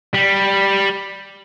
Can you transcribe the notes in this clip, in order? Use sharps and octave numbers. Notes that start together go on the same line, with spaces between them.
G3